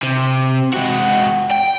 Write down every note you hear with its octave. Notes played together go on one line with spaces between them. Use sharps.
C3
G#3 F#4
G5